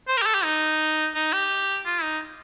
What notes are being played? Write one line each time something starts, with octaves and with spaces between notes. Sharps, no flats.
C5
A#4
G4
A4
G4
D#4
D#4
G4
F4
D#4